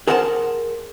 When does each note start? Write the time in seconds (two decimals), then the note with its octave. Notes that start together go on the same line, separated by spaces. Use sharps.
0.07 G#4 A#4 C5 F#5 G#5 A5